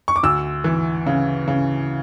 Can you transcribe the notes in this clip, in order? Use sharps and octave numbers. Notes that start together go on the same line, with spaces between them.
C#6
D6
D2 E6
E3
C#3
C#3